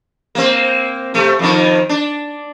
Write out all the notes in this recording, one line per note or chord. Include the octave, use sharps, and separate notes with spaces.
A#3 C4
C3 A3
F2 D#3
D4